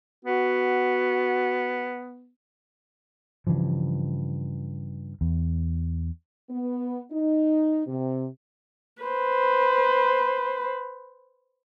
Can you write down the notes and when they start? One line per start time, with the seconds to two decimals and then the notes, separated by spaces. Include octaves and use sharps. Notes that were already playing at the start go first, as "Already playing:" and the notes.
0.25 B3 F#4
3.47 G2 C#3 E3 F3
5.21 E2
6.49 B3
7.10 D#4
7.86 C3
9.03 B4 C5